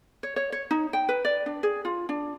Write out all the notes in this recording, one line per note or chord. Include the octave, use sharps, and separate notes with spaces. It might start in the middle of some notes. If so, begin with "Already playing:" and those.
C#5
C#5
C#5
D#4
G5
B4
D5
D4
G#4
F4
D4